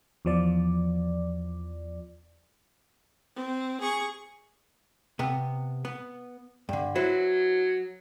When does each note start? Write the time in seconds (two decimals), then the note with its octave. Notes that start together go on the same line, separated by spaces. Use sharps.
0.25 E2 F3 D5
3.35 C4
3.80 G#4 C#6
5.19 C3 B3
5.85 B3
6.69 G2 D3
6.95 F#3 E4 B4 C5